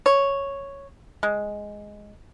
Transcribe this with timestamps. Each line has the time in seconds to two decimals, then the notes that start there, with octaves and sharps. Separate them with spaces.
0.06 C#5
1.23 G#3